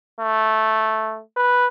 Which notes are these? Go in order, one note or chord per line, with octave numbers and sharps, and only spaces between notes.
A3
B4